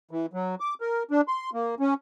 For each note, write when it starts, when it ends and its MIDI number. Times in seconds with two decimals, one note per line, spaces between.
0.11 0.26 52
0.33 0.55 54
0.60 0.74 86
0.81 1.03 70
1.11 1.21 62
1.28 1.50 84
1.54 1.75 58
1.80 1.94 61